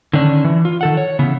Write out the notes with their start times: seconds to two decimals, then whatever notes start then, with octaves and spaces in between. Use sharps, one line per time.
0.13 D3 D#3 C#4 D4
0.44 E3
0.65 F4
0.81 D#3 A4 F#5
0.97 C#5
1.19 C#3 E3 B3